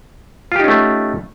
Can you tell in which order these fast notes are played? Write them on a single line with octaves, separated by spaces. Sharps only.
F4 G4 D#4 C#4 A3